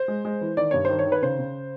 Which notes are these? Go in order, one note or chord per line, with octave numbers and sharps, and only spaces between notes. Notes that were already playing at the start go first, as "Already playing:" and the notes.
Already playing: C5
G#3
G#3
E3
D#3 D5
G2 C#5
D#3 C5
C#5
D#3
B4
C#3 C5
C#3